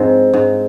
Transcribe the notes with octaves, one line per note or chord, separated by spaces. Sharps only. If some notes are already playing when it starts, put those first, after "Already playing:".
Already playing: G#2 F3 C4
G#2